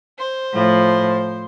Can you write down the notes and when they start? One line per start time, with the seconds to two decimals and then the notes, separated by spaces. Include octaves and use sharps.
0.19 C5
0.55 A2 F3